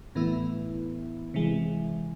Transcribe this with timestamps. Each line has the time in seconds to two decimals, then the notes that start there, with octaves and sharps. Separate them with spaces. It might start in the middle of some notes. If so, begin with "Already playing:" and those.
0.15 A2 E3 B3 E4
1.34 C3 E3 G#3